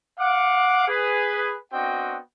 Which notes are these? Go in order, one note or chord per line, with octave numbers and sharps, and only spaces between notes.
F5 F#5 D6
G#4 B4
B3 C4 D4 F#4 D#5 G5